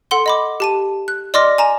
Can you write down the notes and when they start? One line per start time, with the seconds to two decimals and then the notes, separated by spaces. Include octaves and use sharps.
0.11 A4 F#5 C6 G7
0.26 D#5 B5 D6
0.60 G4 A5 D#7
1.08 F#6
1.34 D5 D#5 C6 D6 F6 A#6
1.58 G#5 A#5 E7